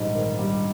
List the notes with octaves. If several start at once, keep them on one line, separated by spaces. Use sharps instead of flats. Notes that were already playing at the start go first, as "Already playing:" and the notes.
Already playing: A#1 G#2 D#3 G3
D#3
G3